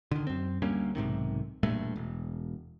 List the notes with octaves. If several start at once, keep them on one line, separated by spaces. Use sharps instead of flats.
D3 D#3
F#2 C4
D2 G3 A#3 C#4
B1 G#2 C3 D#3
E1 G2 A#2 A3
E1